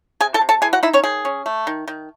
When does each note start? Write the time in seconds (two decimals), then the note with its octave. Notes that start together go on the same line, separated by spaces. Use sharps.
0.21 C3 G#4 G#5
0.34 A4 A5
0.41 C3
0.49 A4 A5
0.62 E3 G#4 G#5
0.73 F#4 F#5
0.83 D#4 E4 E5
0.93 C#4 C#5
1.04 D#3 G#4
1.25 C#4
1.46 A3
1.67 D#3
1.88 D#3